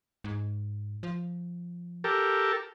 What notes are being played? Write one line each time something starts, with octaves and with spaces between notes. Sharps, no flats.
G#2
F3
G4 A4 A#4